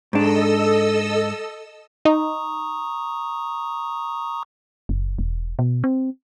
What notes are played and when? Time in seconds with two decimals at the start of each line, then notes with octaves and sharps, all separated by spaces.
0.13 G#2 D4 A4 D#5 E6
2.05 D#4 A#5 C#6 D#6
4.89 F#1
5.19 E1
5.59 B2
5.84 C4